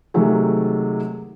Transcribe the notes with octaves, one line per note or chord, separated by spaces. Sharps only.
C3 D#3 F#3 G#3 A3